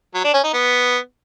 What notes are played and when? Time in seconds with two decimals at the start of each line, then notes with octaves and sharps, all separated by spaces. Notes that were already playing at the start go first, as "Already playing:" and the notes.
0.14 F#3
0.24 D4
0.34 C#4
0.43 D#4
0.53 B3